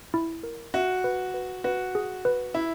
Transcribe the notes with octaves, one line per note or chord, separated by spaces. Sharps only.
E4
A#4
F#4 E5
B4
B4
F#4 B4
G#4
B4
E4 E5